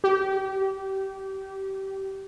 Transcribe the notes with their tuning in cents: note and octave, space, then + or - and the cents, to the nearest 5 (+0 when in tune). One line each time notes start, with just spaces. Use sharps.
G4 -25